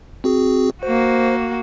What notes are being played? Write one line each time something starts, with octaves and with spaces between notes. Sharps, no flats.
C4 F#4 G#4
A#3 F#4 C5